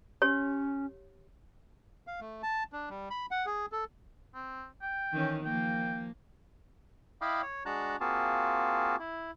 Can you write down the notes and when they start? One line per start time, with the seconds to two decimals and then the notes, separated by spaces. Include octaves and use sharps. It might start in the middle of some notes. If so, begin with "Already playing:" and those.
0.22 C#4 G4 C#5
2.07 F5
2.20 A3
2.43 A5
2.73 D4
2.90 G3
3.10 B5
3.31 F#5
3.46 G#4
3.72 A4
4.35 C4
4.82 G5
5.13 D#3 E3 C#4
5.45 F3 A#3 G5
7.21 E4 D#5 F5 G5 B5 D6
7.42 C#5
7.66 G#3 D4 F#4 A5 A#5 F#6
8.01 A#3 C4 F4 F#4 G#4 A5
9.00 E4